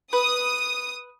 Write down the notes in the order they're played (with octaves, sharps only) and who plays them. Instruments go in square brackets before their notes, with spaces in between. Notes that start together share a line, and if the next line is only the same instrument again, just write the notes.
[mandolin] B4 [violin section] D#6